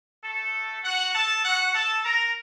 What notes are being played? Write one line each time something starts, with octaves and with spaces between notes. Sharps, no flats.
A3 A4
F#4 F#5
A4 A5
F#4 F#5
A4 A5
A#4 A#5